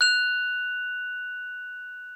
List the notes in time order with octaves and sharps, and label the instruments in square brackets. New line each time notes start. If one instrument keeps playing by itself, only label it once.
[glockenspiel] F#6 F7